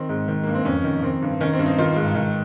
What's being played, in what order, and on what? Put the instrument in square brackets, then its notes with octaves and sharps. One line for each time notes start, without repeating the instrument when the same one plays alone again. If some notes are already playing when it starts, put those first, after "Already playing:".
Already playing: [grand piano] D#3 C4
G#2
D#3
G2 A#3
C4
F2 C#4
D#3
D#3 C4
G2
D#3 C#4
C4
G2
D#4
D#3 F4
G#2
D#3